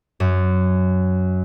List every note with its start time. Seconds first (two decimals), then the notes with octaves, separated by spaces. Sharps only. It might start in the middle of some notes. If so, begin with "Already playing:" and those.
0.20 F#2